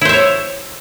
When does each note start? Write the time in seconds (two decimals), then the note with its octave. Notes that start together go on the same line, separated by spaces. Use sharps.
0.01 E4
0.05 C5
0.09 E5
0.13 C#5